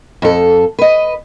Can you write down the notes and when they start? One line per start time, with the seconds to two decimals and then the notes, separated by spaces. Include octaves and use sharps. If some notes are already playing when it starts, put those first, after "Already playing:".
0.22 F2 A4
0.79 B4 D#5